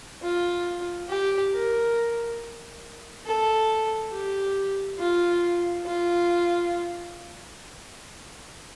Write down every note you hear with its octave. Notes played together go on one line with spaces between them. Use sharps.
F4
G4
A#4
A4
G4
F4
F4